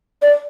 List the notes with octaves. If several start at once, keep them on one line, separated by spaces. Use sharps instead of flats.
D5